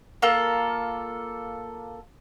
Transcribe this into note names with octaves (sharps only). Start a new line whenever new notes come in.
A#3 F4 A4